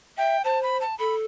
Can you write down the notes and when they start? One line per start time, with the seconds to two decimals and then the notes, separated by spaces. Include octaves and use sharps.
0.18 E5 G5
0.44 C5 A5
0.63 B5
0.81 A5
0.99 A4 B5